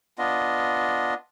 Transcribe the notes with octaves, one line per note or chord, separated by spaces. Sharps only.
B3 D4 F4 D#5